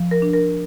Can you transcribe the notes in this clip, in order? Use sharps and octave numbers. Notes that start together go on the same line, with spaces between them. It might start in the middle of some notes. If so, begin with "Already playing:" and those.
Already playing: F3
A#4
D4
A#4